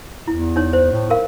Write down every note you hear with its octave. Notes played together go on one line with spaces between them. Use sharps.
E2 E4
D#4 C#5
C5
A2
A#4 F5